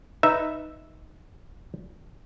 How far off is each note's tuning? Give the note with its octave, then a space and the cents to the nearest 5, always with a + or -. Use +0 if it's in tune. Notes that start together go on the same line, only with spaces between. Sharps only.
D#4 +0 B4 +0 E5 -5